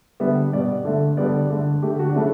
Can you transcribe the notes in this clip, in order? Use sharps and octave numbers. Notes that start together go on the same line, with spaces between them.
D3 G3 B3 E5
B2 G3 B3 D5
D3 A3 E5
D3 G3 B3 D5
D3 A3
D3 A3 G4
F#4
D4
C#3 F#3 A3 E4